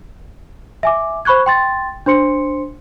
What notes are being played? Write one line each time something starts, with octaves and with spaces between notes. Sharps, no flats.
E5 G#5 D6
C5 B5 C#6 F#6 G#6
G5 C6 A6
D4 C5 C6 C#7